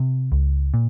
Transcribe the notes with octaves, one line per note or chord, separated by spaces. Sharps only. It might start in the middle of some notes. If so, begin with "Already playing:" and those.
Already playing: C3
C#2
A#2